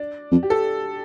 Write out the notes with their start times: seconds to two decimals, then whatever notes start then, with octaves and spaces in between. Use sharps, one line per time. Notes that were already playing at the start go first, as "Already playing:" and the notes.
Already playing: D4 D5
0.32 F2
0.43 G4
0.50 A4